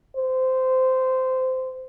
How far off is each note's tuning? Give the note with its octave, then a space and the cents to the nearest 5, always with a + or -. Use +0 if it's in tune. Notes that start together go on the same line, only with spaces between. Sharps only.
C5 -15